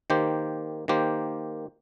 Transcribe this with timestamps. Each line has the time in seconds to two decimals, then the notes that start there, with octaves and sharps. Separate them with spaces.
0.10 D#3 A#3 G4 C5
0.88 D#3 A#3 G4 C5